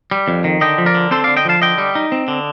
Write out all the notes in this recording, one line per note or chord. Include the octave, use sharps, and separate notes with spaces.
G3
F2
D#3
D3 D#5 G5
F3
A#4 D5
D3
C4 A4 C5
D3 D5 F5
D#5 G5
F3 F5 A5
D3 D#5 G5
G3
D#4
C4
D3